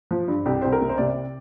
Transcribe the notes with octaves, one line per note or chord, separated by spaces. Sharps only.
F3
G2
C2 G4
C2 C5
A#4
C3
C5
C3 D5